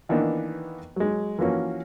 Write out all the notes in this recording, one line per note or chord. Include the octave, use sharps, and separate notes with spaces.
D#3 E3 A#3 B3 D4 D#4
F#3 G#3
E3 F3 A#3 C#4 F#4